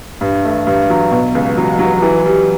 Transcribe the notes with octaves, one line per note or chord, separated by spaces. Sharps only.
G2
A3
G2
F#3
B2
C#2
F#3
F#3
E3
G3